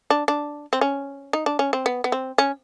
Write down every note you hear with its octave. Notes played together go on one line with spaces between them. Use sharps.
D4
D4
C4
C#4
D#4
D4
C#4
C4
B3
B3
C4
C#4